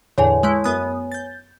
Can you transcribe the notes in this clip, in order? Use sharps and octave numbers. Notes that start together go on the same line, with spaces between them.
E2 A2 D3 C#5 G#5
G#3 A3 E4
F#2 B3 D#6
G6 A6